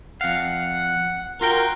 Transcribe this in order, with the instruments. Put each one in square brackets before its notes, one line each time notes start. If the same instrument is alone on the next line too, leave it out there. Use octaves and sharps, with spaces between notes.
[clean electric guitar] F2 F5 [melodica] F#5
[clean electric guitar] F4 F#4 G5 [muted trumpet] A#4 [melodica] C6